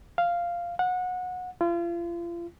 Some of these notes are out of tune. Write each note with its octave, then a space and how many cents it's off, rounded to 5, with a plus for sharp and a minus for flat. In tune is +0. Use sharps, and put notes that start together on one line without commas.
F5 -5
F#5 -25
F4 -35